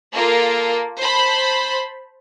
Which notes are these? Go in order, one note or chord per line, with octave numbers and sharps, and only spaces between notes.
A#3 F4 A4 A#4
C5 A5 B5